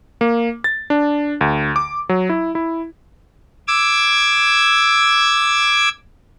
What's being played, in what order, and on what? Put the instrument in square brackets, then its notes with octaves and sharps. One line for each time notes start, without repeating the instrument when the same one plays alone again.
[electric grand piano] A#3
A6
D4
D2
D6
F#3
E4
E4
[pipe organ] D6 E6 G#6